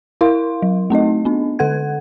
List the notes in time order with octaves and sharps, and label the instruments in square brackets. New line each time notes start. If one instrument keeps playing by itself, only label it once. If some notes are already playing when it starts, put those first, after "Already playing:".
[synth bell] E4 A#4 F5 C6
F#3
A3 C4 D#4 D#5
B3 D4
D3 A4 F#5 G#6